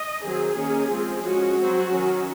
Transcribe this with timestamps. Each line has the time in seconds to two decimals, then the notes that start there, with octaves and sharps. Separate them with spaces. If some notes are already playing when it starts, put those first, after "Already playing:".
Already playing: D#5
0.23 D#3 F#3 C4 G#4
0.57 D#3 A#3 C#4
0.91 F3 G#3 C4
1.25 F3 G#3 C#4 F#4
1.59 F#3 C4
1.93 D#3 F#3 C#4